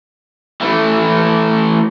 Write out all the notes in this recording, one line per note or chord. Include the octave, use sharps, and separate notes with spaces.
E3 A3